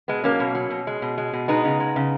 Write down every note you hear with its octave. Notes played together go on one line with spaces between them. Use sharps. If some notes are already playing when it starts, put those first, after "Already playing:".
B2 G#3 B3
F#3 A#3 C#4
B2
F#3
B2
G#3
B2
G#3
B2
G#3 B3 D#4
C#3
G#3
C#3